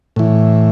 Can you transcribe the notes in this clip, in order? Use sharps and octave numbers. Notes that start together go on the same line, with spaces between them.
A2 E3